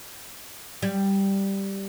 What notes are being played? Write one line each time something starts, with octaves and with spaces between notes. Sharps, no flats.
G3